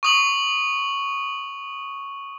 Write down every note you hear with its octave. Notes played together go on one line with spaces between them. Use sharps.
C#6 D#6 F#7